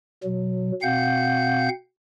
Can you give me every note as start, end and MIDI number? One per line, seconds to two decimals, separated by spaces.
0.23 0.71 47
0.23 0.71 54
0.82 1.68 47
0.82 1.68 60
0.82 1.68 77
0.82 1.68 78
0.82 1.68 91